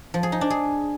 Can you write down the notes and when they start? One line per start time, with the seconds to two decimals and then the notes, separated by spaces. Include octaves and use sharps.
0.14 F3
0.23 G#4
0.32 D#4
0.41 D4
0.50 G#4